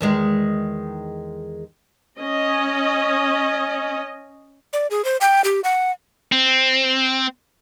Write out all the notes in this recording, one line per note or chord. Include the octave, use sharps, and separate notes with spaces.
E2 D#3 G#3
C#4 D#5
D5
G#4
C5
G5
G4
F#5
C4